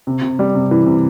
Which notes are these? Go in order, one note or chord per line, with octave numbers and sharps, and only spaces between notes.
C3
C3
G3
C3
E3
C3